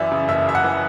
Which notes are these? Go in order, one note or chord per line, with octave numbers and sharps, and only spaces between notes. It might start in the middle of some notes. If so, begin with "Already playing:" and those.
Already playing: F#2 E3 D5 E5
C#3
F#1 E5
F#2 E5
F#5
E3